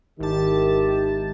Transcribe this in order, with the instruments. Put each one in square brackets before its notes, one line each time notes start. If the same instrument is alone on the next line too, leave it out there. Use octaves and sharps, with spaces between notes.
[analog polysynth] G#1 A5 [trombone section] D#3 E4 [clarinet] G4